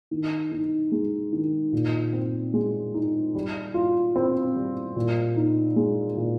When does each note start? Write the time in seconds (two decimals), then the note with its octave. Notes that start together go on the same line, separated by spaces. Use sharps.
0.11 D#3
0.52 D#4
0.92 G#3
1.33 D#3
1.73 A#2
2.13 C4
2.54 G#3
2.95 D#4
3.35 G3
3.74 F4
4.16 C4
4.56 G3
4.96 A#2
5.37 D#4
5.76 G#3
6.17 A#2